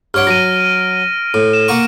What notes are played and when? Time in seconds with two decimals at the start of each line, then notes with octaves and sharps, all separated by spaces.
0.14 G2 C#5 F#5 F6 D7
0.27 F#3 A#6 D#7
1.34 A2
1.53 E7
1.68 A#3 F#5 C#6